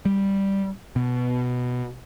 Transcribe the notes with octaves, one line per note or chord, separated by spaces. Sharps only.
G3
B2